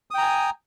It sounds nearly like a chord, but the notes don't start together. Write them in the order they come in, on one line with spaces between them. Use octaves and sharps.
D#6 G5 A#5 G#5